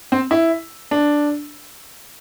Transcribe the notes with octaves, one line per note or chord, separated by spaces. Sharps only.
C4
E4
D4